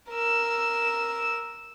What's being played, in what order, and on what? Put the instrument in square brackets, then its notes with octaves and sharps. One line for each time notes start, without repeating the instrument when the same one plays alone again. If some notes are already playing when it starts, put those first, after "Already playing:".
[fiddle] A#4 E6